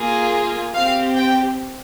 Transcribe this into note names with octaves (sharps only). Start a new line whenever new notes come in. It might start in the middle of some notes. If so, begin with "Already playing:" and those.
Already playing: A#3 F4 G#4
C4 G4 F5
G5